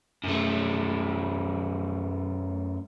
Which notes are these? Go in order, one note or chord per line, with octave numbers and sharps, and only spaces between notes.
F#2 A3